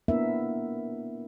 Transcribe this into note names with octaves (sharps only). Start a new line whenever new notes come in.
A#3 B3 D4 E4 A#4 E5